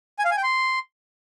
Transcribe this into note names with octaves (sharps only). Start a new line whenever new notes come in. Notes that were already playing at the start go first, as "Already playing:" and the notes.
G#5
F5
G#5
G5
C6